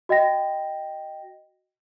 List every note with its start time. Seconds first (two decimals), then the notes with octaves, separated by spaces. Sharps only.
0.09 F#4 D#5 G5 A#6